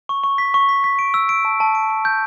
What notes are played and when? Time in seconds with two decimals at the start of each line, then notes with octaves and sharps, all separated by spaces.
0.09 C#6
0.24 C#6
0.38 B6
0.54 C#6
0.69 B6
0.84 B6
0.99 D7
1.14 E6
1.29 D7
1.45 A5
1.60 A5
1.75 D7
1.90 D7
2.05 G6